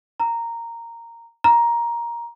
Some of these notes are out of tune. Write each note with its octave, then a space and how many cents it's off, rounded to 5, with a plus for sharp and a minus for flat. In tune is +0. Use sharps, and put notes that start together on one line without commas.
A#5 -10
A#5 +10